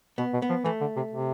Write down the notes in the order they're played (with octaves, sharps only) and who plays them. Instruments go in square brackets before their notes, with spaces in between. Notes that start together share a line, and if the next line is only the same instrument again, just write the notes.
[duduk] B2 [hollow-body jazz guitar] B3
[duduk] B2
[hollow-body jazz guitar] B3
[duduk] F3
[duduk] E3 [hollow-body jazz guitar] A3
[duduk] D3
C3
C3